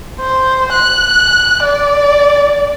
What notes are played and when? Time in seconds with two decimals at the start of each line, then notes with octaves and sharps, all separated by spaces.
0.20 C5
0.72 F#6
1.63 D5